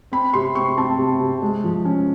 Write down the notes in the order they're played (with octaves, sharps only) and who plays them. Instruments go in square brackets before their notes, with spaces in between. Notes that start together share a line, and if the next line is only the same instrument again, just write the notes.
[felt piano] C4 B5
C3 C6
C4 C#6
C4 A5
C3
C3
G#3
F3
C#4